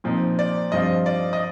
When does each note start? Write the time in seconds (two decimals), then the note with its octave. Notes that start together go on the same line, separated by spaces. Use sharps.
0.04 A#2 F3 C4 D#4
0.39 D5
0.72 G2 F3 C4 F4 D#5
1.06 D5
1.33 D#5